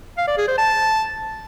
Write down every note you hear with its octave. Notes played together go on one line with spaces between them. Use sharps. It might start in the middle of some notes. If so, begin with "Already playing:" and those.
F5
D5
G#4
C5
A5